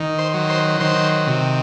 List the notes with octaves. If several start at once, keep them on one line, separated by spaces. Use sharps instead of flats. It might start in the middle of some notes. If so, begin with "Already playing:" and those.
Already playing: D#3
C5
F#3
C5
D#3 C5
C3